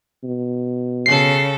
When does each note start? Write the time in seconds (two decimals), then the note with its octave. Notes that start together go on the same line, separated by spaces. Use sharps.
0.24 B2
1.06 C#3 A4 C7